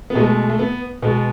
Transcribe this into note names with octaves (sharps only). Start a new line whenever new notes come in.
B3
B2 G#3 A3
A3
B3
B2 G#3 B3